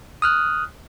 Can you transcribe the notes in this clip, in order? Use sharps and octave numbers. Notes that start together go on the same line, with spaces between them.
D#6 F6 F#6